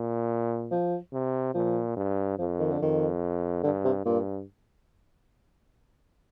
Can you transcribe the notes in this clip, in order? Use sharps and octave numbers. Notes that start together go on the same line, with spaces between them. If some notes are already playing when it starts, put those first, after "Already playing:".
Already playing: A#2
F3
C3
A#2 F3
G2
F2 F3
D#3
D3
F2 D#3
G2 D3
C3
G2 A#2